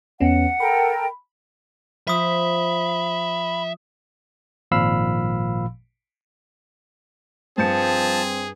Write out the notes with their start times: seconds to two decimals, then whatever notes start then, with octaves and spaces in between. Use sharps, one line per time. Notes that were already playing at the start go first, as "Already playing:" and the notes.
0.20 E2 B3 C#4 F#5
0.60 A4 A#4 G5 B5
2.08 F3 E5 B5 D#6 B6
4.71 G#1 A#2 F3 F5 B5 E6
7.58 G2 F3 C4 G#4 A5 G6 C#7